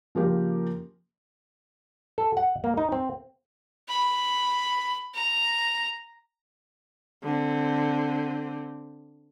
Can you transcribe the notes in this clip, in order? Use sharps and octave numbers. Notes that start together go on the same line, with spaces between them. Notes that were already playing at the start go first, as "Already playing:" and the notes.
C#3 F3 A#3 G4 A#4
A4
F#5
A#3
D#4
C4
B5
A#5
D3 C4